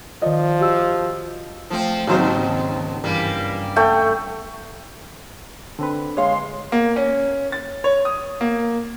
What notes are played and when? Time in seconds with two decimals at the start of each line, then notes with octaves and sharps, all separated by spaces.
0.22 D#3 F3 D5 D#5
0.61 F#4 G4 E6
1.70 F3 A3 C4
2.07 D#2 G#2 C#3 F#3 C4 D#4 C5
3.04 G2 E3 G3 A#3
3.76 A3 G5
5.79 D3 C4 B4
6.17 G#3 C#5 F5 C6
6.72 A#3
6.96 C#4
7.52 A6
7.84 C#5
8.05 D#6
8.41 A#3